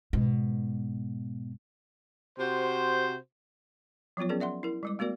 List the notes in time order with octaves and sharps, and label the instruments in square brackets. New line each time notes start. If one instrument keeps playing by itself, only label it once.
[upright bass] G#2 B2
[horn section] C3 F#4 C5
[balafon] F3 F#3 B3 F4 C#5
B3 C#4 G#4 A#4 D5
D5 E5 F#5 C6
E4 A#4
G3 G#3 D6
A3 B3 F#4 A#4 D5